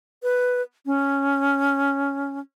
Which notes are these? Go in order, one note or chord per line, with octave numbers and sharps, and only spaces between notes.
B4
C#4